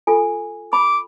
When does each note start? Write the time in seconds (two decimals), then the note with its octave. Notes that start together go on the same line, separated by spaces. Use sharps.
0.07 F4 A4 G#5
0.73 B5 D6